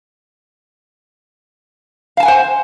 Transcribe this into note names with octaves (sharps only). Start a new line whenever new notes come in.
C5 F5 F#5 G#5 A5